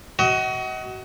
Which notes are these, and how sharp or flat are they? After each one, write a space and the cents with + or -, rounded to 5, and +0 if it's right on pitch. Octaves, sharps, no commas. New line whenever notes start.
F#4 +25 D#5 +35